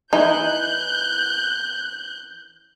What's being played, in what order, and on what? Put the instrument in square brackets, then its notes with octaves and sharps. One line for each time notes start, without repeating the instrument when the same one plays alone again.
[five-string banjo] E3 E4 [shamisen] D#4 [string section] F#6 G6